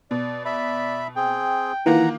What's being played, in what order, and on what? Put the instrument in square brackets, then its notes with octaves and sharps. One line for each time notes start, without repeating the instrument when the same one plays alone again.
[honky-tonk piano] B2 [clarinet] D5
[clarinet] D5 [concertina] E5 B5
[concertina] C4 G#4 [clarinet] G5
[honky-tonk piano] D#3 A#3 F4 [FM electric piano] E3 [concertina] F#5 A#5